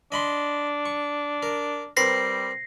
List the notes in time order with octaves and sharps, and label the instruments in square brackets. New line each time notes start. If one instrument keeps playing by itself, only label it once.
[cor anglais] D4 [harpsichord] D#5 B5 C6
[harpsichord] C#6
A#4
[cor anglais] G3 [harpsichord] C4 A#4 B4 [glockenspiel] A#6 C7